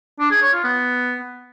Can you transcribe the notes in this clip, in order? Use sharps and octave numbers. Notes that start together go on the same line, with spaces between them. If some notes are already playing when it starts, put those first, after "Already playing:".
D4
G#4
C#5
F4
B3